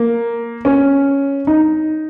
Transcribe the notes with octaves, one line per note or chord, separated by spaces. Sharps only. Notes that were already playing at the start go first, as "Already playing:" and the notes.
Already playing: A#3
C#4
D#4